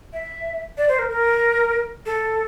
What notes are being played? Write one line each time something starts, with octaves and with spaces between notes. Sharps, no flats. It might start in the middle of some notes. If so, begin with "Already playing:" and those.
E5
D5
C5
A#4
A#4
A4